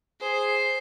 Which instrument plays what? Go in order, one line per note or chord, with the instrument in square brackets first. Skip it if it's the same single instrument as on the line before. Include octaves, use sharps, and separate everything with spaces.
[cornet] G#4 [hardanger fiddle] C5